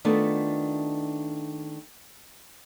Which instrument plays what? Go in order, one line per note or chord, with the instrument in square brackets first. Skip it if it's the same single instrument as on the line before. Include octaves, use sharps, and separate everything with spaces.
[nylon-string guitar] D#3 A3 B3 D4 F4